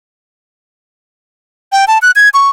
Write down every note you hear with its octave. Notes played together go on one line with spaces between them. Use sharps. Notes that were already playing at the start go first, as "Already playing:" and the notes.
G5
A5
F#6
G#6
C#6